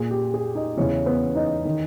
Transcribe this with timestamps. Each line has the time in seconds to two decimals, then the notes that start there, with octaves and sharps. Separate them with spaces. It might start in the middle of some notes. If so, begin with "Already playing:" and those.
Already playing: A#2 G#4
0.11 G4
0.34 G#4
0.55 D#4 D#5
0.77 E2 C#3 E3 C#4 C#5
1.06 B3 B4
1.35 D#4 D#5
1.65 D#3